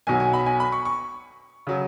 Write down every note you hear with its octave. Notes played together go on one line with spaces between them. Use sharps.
B1 B2 F#3 G#5
G#5
B5
G#5
B5
C#6
C#6
C#3 F#3